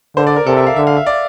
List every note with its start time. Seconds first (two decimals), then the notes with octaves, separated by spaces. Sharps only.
0.16 D3 C5
0.27 D5
0.36 A#4
0.46 C3 A4
0.57 E5
0.67 F5
0.76 D3 E5
0.87 F5
0.97 E5
1.06 D5